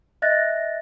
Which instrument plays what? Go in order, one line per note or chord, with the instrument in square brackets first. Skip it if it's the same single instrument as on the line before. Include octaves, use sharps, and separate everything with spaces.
[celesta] D#5 E5 F#6 A6 A#6